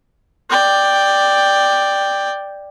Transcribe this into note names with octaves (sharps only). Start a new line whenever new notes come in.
D5 G5